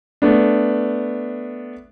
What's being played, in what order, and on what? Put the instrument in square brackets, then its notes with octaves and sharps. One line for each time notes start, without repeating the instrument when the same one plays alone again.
[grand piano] A3 B3 D4